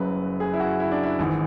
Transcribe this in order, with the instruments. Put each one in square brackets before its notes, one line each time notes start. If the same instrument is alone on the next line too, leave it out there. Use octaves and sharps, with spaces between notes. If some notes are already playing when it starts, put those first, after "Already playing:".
Already playing: [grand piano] F#1 F#2 C#3 F#3 B4
G#4
E4
F#4
E4
D4
E4
G#1 G#2 E3